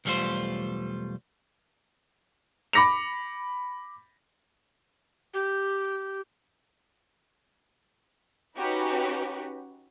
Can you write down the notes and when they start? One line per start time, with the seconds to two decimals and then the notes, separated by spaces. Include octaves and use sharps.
0.05 B1 E2 G3 A3 F4 C5
2.73 B5 D6 A#6 C#7 F7
5.34 G4
8.56 C#4 D#4 F#4 G4 B4